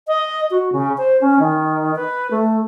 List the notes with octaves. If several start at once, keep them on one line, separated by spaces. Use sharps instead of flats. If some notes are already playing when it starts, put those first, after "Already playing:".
D#5
F#4
C#3
C5
C#4
D#3
B4
A3